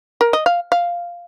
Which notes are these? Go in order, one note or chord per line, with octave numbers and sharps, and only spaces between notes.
A#4
D#5
F5
F5